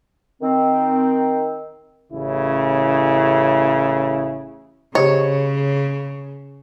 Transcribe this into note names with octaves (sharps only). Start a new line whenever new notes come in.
D#3 C4
A1 C#3 E4
C#3 G4 C5 C#5 D#5